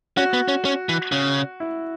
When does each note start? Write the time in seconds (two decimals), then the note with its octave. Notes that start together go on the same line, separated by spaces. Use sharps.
0.17 C#4 F#4
0.34 B3
0.48 C#4
0.65 C#4
0.89 E3
1.12 C#3
1.60 E4